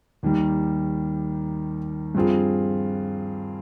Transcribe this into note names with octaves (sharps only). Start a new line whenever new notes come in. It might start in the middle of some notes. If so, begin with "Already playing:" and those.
D#2 D#3 G3
G2 F3 C4 F4 G#4